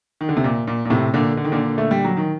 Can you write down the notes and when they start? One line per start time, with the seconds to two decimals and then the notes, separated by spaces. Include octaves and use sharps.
0.21 D#3
0.29 D3
0.37 C3
0.44 A#2
0.67 A#2
0.85 A#2
0.90 A2 C3
1.14 A#2 D3
1.37 D3
1.45 D#3
1.52 A#2 D3
1.78 A3
1.91 G3
2.05 F#3
2.17 D#3